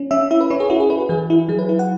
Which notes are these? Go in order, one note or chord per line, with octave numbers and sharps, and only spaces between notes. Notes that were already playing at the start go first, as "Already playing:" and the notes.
Already playing: C#4
C#4 E5
E4 E5
B4
C#4 C#5
G#4
E4 F#4
G#4
E4 B4
F#4
E3 G#4
E4
F#3 G#4
B4
E4
F#5